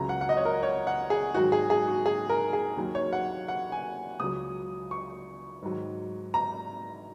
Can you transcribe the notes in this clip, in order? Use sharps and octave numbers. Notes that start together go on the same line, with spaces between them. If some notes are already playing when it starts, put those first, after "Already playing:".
Already playing: C#2 C#3 F#3 A#5
F#5
F#5
D#5
C#5
A#4
C#5
F#5
G#4
G#2 D#3 F#3 F#4
G#4
G#4
F#4
G#4
A#4
G#4
D#2 D#3 F#3
C#5
F#5
F#5
G#5
C#2 C#3 F#3 D#6
C#6
G#2 D#3 F#3
A#5